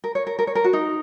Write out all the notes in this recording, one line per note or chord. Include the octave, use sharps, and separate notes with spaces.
A#4
C#5
A#4
A#4
C#5
A#4
F#4
D#4